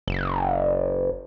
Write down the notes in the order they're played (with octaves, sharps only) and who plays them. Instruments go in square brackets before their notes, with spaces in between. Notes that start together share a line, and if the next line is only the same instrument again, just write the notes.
[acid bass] F#1